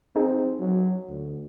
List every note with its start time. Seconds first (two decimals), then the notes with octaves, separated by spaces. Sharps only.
0.16 C4 D#4 G#4
0.60 F#3
1.09 D2